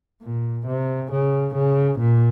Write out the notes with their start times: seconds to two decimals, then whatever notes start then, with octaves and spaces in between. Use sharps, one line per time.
0.23 A#2
0.67 C3
1.11 C#3
1.55 C#3
1.99 A#2